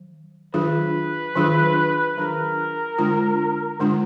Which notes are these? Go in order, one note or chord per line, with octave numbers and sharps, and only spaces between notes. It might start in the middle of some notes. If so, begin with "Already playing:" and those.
Already playing: D#3 F#3
D#3 F#3 D4 F4 G#4 B4
D#3 F#3 D4 F4 G#4
D#3 F#3 D4 F4 G#4 A#4
D3 G#3 D4 F4
D3 G#3 D4 F4